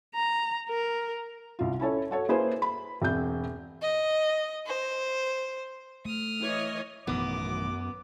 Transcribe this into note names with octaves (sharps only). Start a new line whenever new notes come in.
A#5
A#4
C2 F4
C#4 E4 A4 C#5
F#4 A4 C#5
A#3 E4 G#4 B4 C5
B5
E1 C4 E5 G6
D#5
C5
A3 D#6 F6
E3 C#5 D#5
A1 F#2 B2 D#3 B3 D6